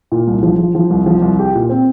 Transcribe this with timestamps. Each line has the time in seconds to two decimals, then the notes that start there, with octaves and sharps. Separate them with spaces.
0.12 A#2
0.27 C2
0.43 F3
0.59 F3
0.75 F3
0.90 C2
1.06 F3
1.22 C2
1.39 G4
1.55 A#2
1.70 C4